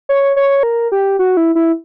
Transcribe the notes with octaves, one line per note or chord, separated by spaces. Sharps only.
C#5
C#5
A#4
G4
F#4
E4
E4